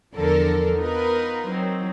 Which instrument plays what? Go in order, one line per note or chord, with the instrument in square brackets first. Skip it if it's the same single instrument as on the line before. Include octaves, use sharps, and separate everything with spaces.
[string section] E2 D3 F3 A4 A#4
B3 D#4 F4 A#4 B4
F#3 C4 D#4